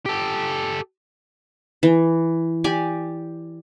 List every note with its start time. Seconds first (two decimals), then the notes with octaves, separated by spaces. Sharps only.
0.06 G4 A4
1.83 E3
2.64 G4 D5 G#5